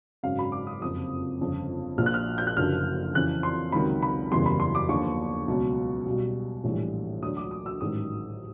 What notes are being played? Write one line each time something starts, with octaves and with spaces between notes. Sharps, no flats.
G#1 F#2 C#3 F5
B5
D6
D#6
F#1 F2 C3 D#6
G1 F2 C#3
A#1 A#2 F3 F6
F#6
F6
G6
F#6
F#1 F#2 D3 F3 F6
F2 C#3 E3 F#6
C6
C#2 C3 D#3 F#3 B5
B5
F#1 E2 C#3 E3 G3 C6
B5
C6
D6
D#2 D3 F3 C#6
C#2 B2 F#3
B1 B2 G3
A#1 A2 E3 G3
D2 D3 F#3 D#6
D6
D#6
E6
A1 G#2 D#3 F#3 D#6